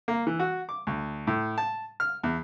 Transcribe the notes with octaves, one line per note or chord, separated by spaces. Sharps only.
A#3
E3
F#4
D6
D2
A2
A5
F6
E2